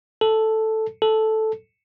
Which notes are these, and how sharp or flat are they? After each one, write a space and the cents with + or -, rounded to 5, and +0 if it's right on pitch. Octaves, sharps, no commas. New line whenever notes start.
A4 +0
A4 -5